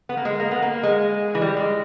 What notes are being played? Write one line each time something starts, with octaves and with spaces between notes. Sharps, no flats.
B3
A#3
G#3
A#3
B3
A#3
G#3
E3
G3
G#3